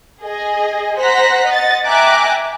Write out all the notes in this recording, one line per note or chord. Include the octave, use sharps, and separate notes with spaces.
G#4 D#5
C5 F#5 A#5 F#6 A#6 B6
D#5 F#5 A6
E5 G5 G#5 A#5 D6 F#6